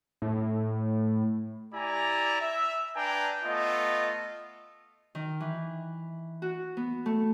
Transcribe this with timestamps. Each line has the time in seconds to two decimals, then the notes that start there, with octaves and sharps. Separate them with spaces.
0.22 A2
1.73 E4 G4 D5 G#5 A#5
2.41 E5
2.95 D4 B4 G5 G#5 A#5
3.43 A3 B3 F4 D#5
5.15 D#3
5.40 E3
6.42 F#4
6.77 B3
7.06 A3